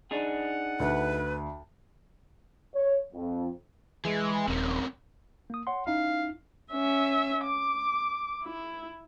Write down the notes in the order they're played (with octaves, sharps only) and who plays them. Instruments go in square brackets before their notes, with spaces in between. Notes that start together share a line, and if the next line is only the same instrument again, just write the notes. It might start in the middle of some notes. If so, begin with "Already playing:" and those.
[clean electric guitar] D4 D#4 G#4 [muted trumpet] F#5
[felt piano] D2 [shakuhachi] B4
[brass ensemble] C#5
F2
[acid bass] E3 [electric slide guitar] G#3 G#4
[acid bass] D#1 [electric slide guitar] C4 C#4 A#4
[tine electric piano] A#3 D#6
C#5 F#5 C6
[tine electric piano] C#4 D#4 E4 [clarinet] F5
[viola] C#4 E5
D6
E4